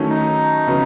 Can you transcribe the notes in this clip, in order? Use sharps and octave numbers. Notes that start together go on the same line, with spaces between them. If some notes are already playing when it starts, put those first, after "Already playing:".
Already playing: D#3 F#3 A3 C#4
D#4
C#3 F#3 B3